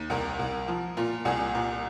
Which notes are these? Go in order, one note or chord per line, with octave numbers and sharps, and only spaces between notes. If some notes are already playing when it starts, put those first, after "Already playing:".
Already playing: D#2
C2 A#4
C2
F3
A#2 F4
C2 G#4
A#2